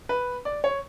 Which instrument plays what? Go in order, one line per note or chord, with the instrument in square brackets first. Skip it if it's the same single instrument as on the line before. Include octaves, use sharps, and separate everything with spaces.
[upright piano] B4
D5
C#5